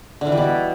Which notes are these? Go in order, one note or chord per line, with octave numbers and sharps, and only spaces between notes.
D3
E3
G3
B2